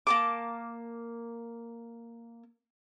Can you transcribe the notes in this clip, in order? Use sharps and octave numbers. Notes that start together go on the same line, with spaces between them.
A#3 A5 D6